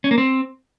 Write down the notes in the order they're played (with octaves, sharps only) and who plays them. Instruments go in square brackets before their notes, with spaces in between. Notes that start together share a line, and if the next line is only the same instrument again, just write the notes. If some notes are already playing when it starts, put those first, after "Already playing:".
[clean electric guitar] C#4
A#3
C4